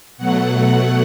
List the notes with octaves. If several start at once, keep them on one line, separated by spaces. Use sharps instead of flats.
B2 F#3 A3 F#5